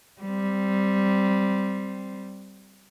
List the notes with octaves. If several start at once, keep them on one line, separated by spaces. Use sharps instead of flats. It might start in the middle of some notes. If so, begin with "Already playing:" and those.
G3 C4